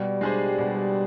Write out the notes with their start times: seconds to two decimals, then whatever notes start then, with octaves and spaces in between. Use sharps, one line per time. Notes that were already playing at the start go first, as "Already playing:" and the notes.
Already playing: B2 G3
0.21 G#3 D4 G#4 C5
0.58 B2